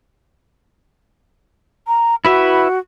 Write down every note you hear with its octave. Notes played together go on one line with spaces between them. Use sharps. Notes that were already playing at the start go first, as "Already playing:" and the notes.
A#5
E4 F#4 B4 E5